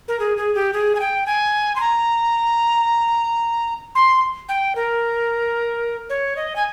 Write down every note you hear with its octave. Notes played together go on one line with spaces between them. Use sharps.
A#4
G#4
G#4
G4
G#4
G#5
G5
G#5
C6
A#5
C6
G5
A#4
C#5
D#5
G#5